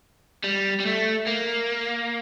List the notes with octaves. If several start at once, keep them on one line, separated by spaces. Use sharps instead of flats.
G3
G3
A3
A#3